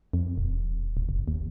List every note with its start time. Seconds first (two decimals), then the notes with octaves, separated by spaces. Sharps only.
0.13 F2
0.38 D#1
0.97 D1
1.09 F#1
1.28 D#2